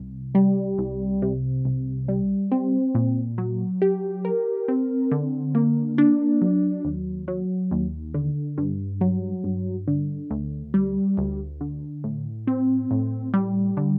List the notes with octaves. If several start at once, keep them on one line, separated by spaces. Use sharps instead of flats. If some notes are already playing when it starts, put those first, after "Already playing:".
Already playing: C2
G3
C2
C3
C2
G3
C4
A#2
F#3
G4
A#4
C4
D3
A#3
D4
F#3
D#2
F#3
D#2
D3
G2
F#3
G2
D3
D2
G3
D2
D3
A2
C4
A2
G3
D3